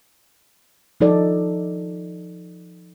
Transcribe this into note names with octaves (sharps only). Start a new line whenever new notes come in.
F3 D#4 A4 D5